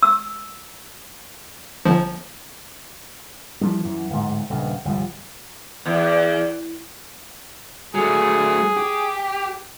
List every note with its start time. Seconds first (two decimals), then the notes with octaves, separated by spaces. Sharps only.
0.03 E6
1.85 G1 F3
3.61 E3 F3 G3 G#3
3.81 F#2 E3
4.10 D1 G#2
4.50 D#1 G2 C#3
4.85 G1 C2 F3 G3
5.85 E2
7.95 F#3 A3 G#4
8.77 G4